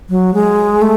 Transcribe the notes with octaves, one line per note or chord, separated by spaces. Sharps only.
F#3
G#3
A3